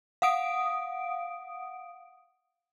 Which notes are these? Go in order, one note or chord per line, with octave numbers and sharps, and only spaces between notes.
F5 F#5 D#6 D7